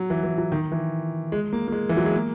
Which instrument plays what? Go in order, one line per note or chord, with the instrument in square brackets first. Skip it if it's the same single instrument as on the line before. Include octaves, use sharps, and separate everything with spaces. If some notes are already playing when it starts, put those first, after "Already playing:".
Already playing: [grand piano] F#3
E3
E3
F#3
D#3
E3
G#3
A#3
A#3
G#3
E3
F#3
G#3
A#3